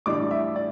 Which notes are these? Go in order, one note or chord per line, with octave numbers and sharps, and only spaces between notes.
A2 E3 G3 D4 D6
E5
D5